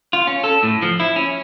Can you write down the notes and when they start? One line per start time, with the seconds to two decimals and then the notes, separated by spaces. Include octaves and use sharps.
0.13 F4
0.27 C#4
0.44 A4
0.63 A2
0.82 F3
1.00 E4
1.16 C#4